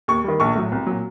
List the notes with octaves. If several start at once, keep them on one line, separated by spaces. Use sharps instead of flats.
D#2 C#6
D#3 G3
A#1 C#6
A2 F#3
C2
A#2 F#3